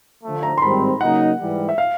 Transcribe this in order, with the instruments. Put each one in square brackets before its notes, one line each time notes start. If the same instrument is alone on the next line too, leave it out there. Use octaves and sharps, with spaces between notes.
[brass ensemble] D3 F3 A3
[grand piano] A#5
C6
[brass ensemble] G#2 D#3 G3 C4 [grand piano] B5
[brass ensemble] C#3 F#3 A#3 D#4 [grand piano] F#5
[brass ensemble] G#2 E3 G3
[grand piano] E5
F5